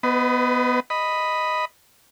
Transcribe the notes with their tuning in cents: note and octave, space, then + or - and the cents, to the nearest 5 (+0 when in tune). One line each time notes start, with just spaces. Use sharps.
B3 +0 B4 +40 D#5 +0
D#5 +0 B5 +0